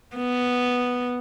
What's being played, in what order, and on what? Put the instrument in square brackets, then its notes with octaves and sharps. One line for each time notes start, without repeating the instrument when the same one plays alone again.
[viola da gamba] B3